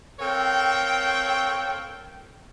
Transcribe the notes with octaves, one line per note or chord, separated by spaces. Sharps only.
C4 A4 A#4 C#5 F5 G5